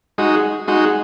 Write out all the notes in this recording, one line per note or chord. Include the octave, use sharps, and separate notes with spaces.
G#3 D#4 F#4
G#3 D#4 F#4